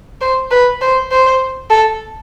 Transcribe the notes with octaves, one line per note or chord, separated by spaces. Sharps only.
C5
B4
C5
C5
A4